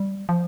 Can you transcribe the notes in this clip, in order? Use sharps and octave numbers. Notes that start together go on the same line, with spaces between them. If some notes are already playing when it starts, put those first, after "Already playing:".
Already playing: G3
F3